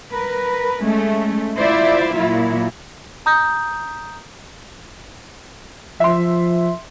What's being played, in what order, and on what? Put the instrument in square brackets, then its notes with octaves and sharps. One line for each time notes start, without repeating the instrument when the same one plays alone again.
[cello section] A#4 B4
G#3 A3 C#4
E4 F4 C5 D5 E5
A#2 F#3 E4 F4
[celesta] A#5 D#6 G6
[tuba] F3 [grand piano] E5 C6